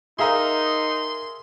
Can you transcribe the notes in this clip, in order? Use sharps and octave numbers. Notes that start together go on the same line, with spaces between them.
D#4 G#4 A#4 E5 F5 A#5 C6 D#6